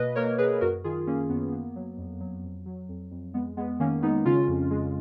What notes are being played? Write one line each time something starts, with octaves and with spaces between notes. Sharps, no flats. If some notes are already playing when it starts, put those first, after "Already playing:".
Already playing: B2 A#3 B4 D#5
A#3 A#4 C#5
B2 G#4 B4
F#2 F#4 A#4
D#3 F4 G#4
D#3 A#3 C#4
F#2 B3
A#3
F#3
F2
F#3
F2
F#3
F2
F2
G#3 B3
G#3 B3
D#3 A#3 C#4
G#3 B3 D#4
C#3 C#4 F4
F2
G#3